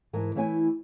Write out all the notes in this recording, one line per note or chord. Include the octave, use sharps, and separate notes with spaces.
G#2 E3 A#4 A5
E3 A3 E4 C#5 G5 G#5